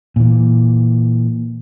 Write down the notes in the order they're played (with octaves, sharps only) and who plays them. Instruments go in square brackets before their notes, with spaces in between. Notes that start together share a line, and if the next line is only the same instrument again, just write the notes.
[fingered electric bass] A#2 E3